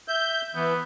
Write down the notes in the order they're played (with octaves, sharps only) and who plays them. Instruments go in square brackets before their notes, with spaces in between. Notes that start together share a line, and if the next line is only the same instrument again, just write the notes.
[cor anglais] E5 [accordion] G6
[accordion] E3 [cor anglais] B3